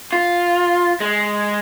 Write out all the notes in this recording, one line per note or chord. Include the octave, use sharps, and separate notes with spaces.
F4
G#3